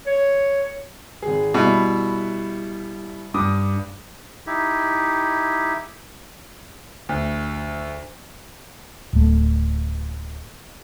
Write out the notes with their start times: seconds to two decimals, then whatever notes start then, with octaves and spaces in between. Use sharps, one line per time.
0.06 C#5
1.22 G#1 G#4
1.54 B2 G3 E4 E5
3.34 G2 D6 D#6
4.47 D#4 E4 G4
7.09 D2
9.13 D1 A3